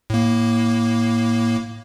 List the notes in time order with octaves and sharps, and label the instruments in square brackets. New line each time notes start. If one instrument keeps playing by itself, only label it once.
[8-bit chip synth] A2 A#3